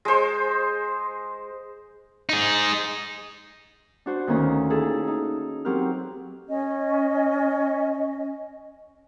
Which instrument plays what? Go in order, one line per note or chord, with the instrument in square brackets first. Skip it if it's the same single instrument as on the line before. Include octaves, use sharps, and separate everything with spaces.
[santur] G#3 C5
[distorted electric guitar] D#4 G#4
[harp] D4 F#4 C5
D2 D#3 A#3 C#4 D#6
D#4 E4 G#4 A4
D#4
F#3 C4 G4 A#4 F6
[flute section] C#4 D#5